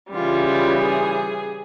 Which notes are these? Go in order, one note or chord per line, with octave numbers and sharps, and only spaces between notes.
C#3 E3 G3 F4
F4
G#4